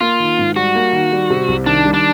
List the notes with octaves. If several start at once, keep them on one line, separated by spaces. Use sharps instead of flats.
A#3 F4
D#3
G#2
G3 F#4
A#3
D#3
G3
C3
C2
D#3 D4
G3
D4